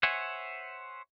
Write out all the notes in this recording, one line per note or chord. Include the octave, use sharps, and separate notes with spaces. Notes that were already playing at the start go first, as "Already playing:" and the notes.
C5 C#5 E5 F#5 G#5